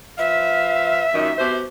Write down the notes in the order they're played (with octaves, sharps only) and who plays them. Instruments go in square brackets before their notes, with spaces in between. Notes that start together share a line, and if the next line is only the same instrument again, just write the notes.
[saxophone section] F3 B4 F5 [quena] E5
[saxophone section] F#2 A#2 D#3
B2 G4 C5